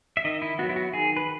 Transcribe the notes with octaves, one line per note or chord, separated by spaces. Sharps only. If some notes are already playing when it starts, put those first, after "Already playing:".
E5
D#3 D#5
E4
F#3 B3 F#4
E4
F#4
D#3 G#4
B4